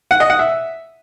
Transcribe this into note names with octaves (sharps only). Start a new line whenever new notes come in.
F#5
D#5
F#5
E5